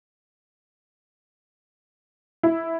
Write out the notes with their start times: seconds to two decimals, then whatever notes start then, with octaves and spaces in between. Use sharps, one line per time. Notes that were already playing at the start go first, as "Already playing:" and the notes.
2.43 E4